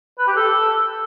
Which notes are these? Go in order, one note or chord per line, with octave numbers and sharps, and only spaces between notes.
B4
G4
A4